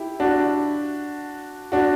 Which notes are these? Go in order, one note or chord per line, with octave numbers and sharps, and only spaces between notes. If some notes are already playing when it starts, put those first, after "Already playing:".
Already playing: E4 G4
D4 F#4
D4 F#4